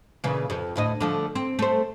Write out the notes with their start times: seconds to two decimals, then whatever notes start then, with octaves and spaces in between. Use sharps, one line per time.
0.24 A#2 C#3 E3
0.50 F2
0.76 D2 A2 D#5
1.00 D3 F3 A3
1.35 C4
1.59 A3 C5